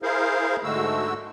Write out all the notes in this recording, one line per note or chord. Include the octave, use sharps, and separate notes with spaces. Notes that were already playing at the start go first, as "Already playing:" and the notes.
E4 G#4 A#4 C5 F5
G#2 D3 G#3 A3 F#4 E6